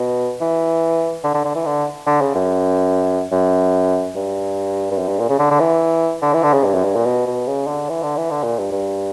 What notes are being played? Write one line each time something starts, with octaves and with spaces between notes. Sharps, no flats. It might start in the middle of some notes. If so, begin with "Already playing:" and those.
Already playing: B2
E3
D3
D3
D3
E3
D3
D3
C#3
F#2
F#2
G2
G2
F#2
G2
A#2
C#3
D3
D3
E3
D3
E3
D3
C#3
G2
F#2
G2
A#2
B2
B2
C#3
D3
E3
D3
E3
D3
A#2
G2
G2